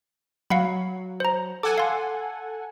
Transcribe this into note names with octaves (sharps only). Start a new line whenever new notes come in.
F#3 F5 F#5 B5
C5 A#5
A4 F#5 G#5 D6
F5 C6